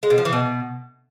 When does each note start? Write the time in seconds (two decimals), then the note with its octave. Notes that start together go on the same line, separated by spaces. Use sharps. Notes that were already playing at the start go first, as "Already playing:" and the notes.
0.03 G#3
0.10 B2
0.18 F3
0.25 E3
0.33 B2